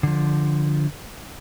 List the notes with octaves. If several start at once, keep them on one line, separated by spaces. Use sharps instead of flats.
D3 F3